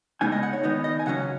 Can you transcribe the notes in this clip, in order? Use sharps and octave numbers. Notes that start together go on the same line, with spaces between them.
C#3 G#3 B3 D#4 G#5
D#5
F#5
C#5
D#3 B3 D#4 D#5
D#5
G#5
C#3 F#3 C#4 F#5